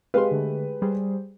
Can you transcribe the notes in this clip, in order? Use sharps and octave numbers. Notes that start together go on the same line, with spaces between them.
G#3 G4 B4 F5 C6
D3 A3
G3 G#4 C5